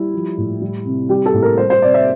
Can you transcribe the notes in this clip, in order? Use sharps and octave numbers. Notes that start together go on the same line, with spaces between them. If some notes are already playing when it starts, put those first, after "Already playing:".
Already playing: G3 E4
F3
A2
G3
C3
G3 G4
A4
A2
A#4
G3 C5
C5
C3 D5
E5